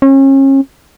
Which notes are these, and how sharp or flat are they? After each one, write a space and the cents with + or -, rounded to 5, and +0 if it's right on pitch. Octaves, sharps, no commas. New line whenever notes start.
C#4 -35